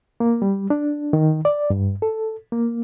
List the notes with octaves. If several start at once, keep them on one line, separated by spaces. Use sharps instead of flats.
A#3
G3
D4
D#3
D5
G2
A4
A#3